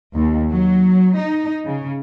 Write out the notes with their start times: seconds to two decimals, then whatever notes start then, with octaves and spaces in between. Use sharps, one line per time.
0.14 D#2
0.52 F#3
1.19 D#4
1.65 C#3